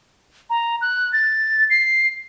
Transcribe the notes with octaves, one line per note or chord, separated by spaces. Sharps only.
A#5
F#6
A6
C7